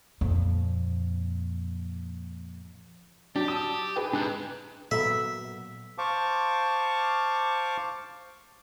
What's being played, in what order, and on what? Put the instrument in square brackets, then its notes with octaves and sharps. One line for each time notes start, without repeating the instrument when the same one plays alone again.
[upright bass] F2 A#2
[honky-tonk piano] F#3 [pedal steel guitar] D4 [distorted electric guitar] G4
[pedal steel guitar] A5 E6 [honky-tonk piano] D#6
[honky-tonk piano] G#4 B4 G5
[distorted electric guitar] G#2 [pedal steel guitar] D4 F#6
[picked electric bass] A#2 F#3 B3 [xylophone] A4 [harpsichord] E5
[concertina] C5 F5 A5 C#6 D6